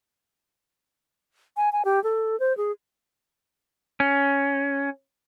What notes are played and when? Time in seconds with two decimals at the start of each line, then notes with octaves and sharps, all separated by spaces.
1.57 G#5
1.72 G#5
1.85 G4
2.04 A4
2.40 C5
2.57 G#4
4.00 C#4